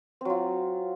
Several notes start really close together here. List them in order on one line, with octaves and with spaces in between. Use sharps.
C4 F#3 F4